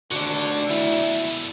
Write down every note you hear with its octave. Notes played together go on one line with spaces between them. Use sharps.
G#1 D#2 D3 D4 F#4 D5
B2 A3 E4